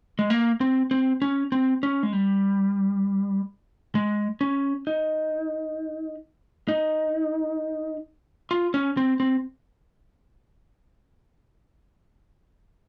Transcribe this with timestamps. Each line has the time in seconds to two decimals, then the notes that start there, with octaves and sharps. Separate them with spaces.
0.19 G#3
0.30 A#3
0.61 C4
0.91 C4
1.22 C#4
1.52 C4
1.83 C#4
2.03 G#3
2.13 G3
3.95 G#3
4.41 C#4
4.87 D#4
6.68 D#4
8.51 F4
8.74 C#4
8.97 C4
9.20 C4